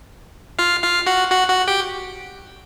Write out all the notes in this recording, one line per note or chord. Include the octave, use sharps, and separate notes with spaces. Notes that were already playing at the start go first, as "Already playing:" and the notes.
F4 F5
F4 F5
F#4 F#5
F#4 F#5
F#4 F#5
G4 G5